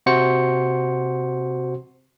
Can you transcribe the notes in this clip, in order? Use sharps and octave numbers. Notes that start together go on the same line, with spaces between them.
C3 F#4 C5 C#7